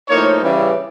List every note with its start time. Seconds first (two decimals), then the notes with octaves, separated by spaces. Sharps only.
0.08 A2 F3 A#3 D#4 C#5
0.40 C#3 E3 G3